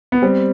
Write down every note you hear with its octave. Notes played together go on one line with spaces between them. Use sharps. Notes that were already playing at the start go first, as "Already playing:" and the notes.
B3
G3 C4